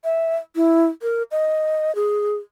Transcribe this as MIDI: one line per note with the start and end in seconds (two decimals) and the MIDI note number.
0.04 0.36 76
0.56 0.86 64
1.02 1.23 70
1.31 1.94 75
1.95 2.35 68